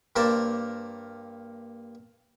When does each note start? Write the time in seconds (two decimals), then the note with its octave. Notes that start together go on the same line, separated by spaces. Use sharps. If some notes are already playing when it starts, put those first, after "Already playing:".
0.16 G2 A#3 A#4 C5 D5 A5